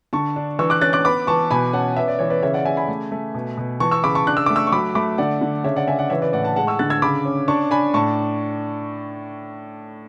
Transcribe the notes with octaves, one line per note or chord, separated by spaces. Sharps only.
D3 A5 C#6
D4
E3 C#6 E6
D6 F#6
C#4 F#6 A6
D6 F#6
B3 B5 D6
E3 A5 C#6
B2 G#5 B5
C#4 F#5 A5
B3 E5
D5
E3 C#5
B4 D5
C#3 C#5 E5
D5 F#5
C#3 E5 G#5
G#5 B5
A3
A3
B2
B2
E3 A5 C#6
C#6 E6
C#3 B5 D6
A5 C#6
D4 F#6
E6
A3 D6
C#6 E6
C#6
F#3 B5 D6
A3 B5 D6
D3 D5 F#5
D3
C#3 C#5 E5
D5 F#5
C#3 E5 G#5
D5 F#5
E3 C#5 E5
B4 D5
A2 D5 F#5
F#5 A5
G#3 F#5 A5
C#6 E6
D3 F#6 A6
E6 G#6
C#3 B5 D6
C#4
D4 A5 C#6
D4 G#5 B5
A2 A5 C#6